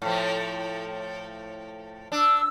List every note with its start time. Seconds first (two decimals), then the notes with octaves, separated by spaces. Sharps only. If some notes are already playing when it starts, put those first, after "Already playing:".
0.02 A2 F3
2.12 D4 E6